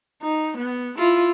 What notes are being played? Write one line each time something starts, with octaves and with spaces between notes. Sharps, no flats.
D#4
B3
E4 F4